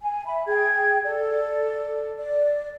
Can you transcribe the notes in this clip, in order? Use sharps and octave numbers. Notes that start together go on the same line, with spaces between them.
G#5
E5 B5
G#4 G5 G#6
A4 D5
D5